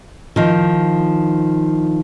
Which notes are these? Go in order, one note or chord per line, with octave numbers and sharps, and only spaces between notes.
D#3 F3